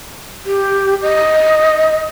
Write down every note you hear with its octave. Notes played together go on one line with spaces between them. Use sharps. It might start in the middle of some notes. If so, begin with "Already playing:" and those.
G4
D#5